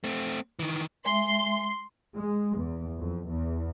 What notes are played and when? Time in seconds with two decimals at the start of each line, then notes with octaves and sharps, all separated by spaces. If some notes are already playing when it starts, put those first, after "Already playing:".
0.04 A3 C4
0.59 D#3 E3
1.06 G#3 E5 C6
2.15 G#3
2.58 E2
2.99 F2
3.29 E2